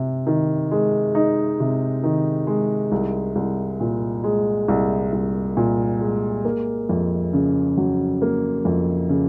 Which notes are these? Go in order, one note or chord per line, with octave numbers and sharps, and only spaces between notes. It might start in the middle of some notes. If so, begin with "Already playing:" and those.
Already playing: C3
D#3
G#3
D#4
C3
D#3
G#3
C2
C2
A#2
G#3
C2
C2
A#2
G#3
A#3
F2
C#3
F#3
A#3
F2
C#3